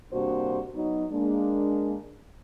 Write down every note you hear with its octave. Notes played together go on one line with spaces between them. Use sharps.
G2 C3 A#3 D4 F#4 C5
F#3 B3 D#4
G#3 A#3 D4